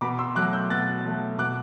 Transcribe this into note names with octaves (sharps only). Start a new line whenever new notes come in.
B2 B5 D6
C6 E6
F#3 A3 D6 F#6
E6 G6
B2 F#6 A6
F#3 A3
B2 D6 F#6